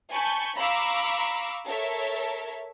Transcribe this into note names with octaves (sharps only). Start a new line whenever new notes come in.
G#5 A5 B5 C#6 G6
F5 A#5 B5 C#6 D6 E6
A4 A#4 C#5 E5 A5